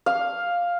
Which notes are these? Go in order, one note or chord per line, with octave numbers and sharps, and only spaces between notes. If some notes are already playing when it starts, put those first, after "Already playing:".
F5